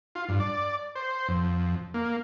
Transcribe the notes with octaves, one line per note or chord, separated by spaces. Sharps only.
F4
G2
D5
C5
F2
A#3